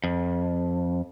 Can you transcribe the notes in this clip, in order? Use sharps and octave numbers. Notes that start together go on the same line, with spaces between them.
F2